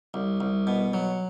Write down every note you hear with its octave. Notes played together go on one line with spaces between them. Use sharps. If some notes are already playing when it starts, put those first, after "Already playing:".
C2
C2
B2
F#3